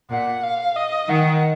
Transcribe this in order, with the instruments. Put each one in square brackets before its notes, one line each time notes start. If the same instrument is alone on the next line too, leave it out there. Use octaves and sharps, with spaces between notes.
[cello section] A#2 [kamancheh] F#5
[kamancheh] F5
D#5
[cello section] D#3 [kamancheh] F#5